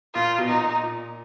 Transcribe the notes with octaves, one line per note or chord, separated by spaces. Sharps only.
A#2 F4
B2
A#2 D#4
A#2